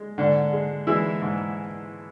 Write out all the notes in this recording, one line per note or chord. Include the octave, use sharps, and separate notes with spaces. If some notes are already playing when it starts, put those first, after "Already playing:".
Already playing: G#3
G#2 D3 D4
G#3
E3 G#3 E4
G#2